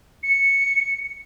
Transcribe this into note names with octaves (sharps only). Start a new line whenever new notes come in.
C#7